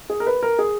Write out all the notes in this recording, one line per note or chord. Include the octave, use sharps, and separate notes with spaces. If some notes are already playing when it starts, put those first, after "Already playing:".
G#4
A#4
B4
A#4
G#4